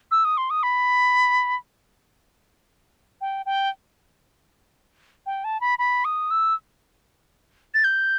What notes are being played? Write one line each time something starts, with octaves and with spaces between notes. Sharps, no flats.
E6
D#6
C6
D#6
B5
G5
G5
G5
A5
B5
B5
D#6
E6
A6
G6